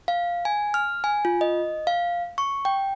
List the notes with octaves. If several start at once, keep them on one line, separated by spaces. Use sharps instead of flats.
F5
G#5
F6
G#5
F4
D#5
F5
C#6
G5